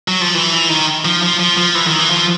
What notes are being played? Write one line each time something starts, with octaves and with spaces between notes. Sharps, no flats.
F#3
F3
E3
D#3
F3
F3
F3
F3
E3
D#3
E3
F3